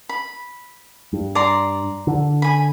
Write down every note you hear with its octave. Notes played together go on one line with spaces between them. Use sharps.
B5
G2
D5 A#5 C6
D3
G#5 B5